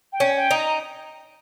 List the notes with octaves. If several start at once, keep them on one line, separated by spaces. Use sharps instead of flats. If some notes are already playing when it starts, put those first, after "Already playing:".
G5
C#4
G5
D#4
A#5